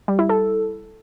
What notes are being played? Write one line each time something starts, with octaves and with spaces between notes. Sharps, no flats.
G3
E4
A4